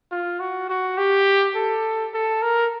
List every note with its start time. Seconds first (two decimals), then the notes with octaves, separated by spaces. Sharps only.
0.12 F4
0.40 F#4
0.69 F#4
0.98 G4
1.56 A4
2.14 A4
2.42 A#4